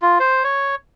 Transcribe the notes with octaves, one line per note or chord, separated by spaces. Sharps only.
F4
C5
C#5